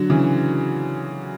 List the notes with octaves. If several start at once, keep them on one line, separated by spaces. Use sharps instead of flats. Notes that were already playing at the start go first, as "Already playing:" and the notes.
Already playing: D3 F#3
C#3 E3